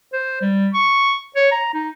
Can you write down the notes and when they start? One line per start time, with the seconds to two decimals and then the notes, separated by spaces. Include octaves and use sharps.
0.13 C5
0.42 G3
0.74 C#6
1.36 C#5
1.52 A#5
1.74 D#4